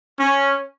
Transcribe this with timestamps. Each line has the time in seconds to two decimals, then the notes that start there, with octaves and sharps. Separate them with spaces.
0.18 C#4